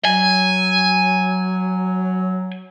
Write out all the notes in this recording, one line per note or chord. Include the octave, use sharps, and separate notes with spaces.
F#3 G#5